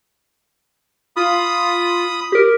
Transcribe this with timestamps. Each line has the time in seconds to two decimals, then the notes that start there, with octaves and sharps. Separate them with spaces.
1.16 F4 B5 D#6
2.32 G4 A#4